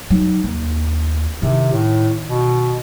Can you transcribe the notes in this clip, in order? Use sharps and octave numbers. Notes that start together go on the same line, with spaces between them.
F#3 D#4
D#2
C3 D#3 E4
A2
B2